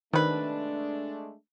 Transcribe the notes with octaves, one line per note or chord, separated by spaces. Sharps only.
C3 D#3 G#3 A3 D4 B4